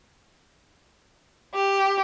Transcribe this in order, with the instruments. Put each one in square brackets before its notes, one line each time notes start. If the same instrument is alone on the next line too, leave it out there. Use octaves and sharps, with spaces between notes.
[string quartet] G4